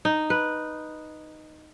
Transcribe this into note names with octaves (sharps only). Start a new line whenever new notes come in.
D#4
B4